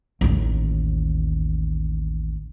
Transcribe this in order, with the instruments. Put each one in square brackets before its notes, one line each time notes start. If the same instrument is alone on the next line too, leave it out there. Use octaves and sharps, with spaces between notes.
[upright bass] A1 D#2